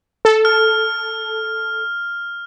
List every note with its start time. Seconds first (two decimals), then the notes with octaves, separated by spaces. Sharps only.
0.25 A4
0.45 F6